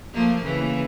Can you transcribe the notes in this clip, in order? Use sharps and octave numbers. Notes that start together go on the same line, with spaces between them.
F3 A3 A#3
C#3 E3